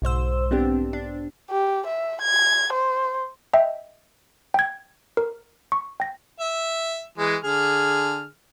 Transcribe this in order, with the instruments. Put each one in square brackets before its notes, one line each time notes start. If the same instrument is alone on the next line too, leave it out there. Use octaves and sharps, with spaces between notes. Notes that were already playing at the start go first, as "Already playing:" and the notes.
[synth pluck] B1 G#2 C5 E6
B3 C4 D4 G4
D4
[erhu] G4
E5
G#6
C5
[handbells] D#5 E5 G5
G5 G#6
A#4
C#6
G5 A#6
[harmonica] E5
E3 G#3
D3 G#4 F6